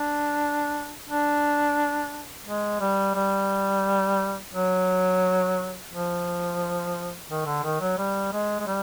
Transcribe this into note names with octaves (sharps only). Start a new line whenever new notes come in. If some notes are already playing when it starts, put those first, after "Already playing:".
Already playing: D4
D4
G#3
G3
G3
F#3
F3
D#3
D3
D#3
F#3
G3
G#3
G#3
G3